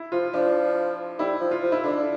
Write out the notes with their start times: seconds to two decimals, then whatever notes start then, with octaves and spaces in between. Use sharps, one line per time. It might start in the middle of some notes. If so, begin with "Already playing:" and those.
Already playing: E4
0.12 F3 F4
0.33 F3 D4
1.19 G3 E4
1.40 F3
1.51 F4
1.62 F3
1.72 E4
1.84 D3 D4